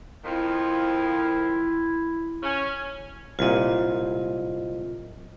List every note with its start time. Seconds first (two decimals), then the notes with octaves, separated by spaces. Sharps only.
0.25 F2 D#3 F3 E4
2.43 C#4
3.39 D1 C2 A#2 F4 D#5